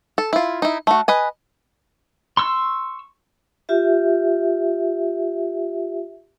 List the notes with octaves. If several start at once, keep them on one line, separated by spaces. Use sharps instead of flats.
A4
E4 F4
D#4 E4
A3 F#4
B4 D#5 G#5
C6 C#6 E6
F4 G4 E5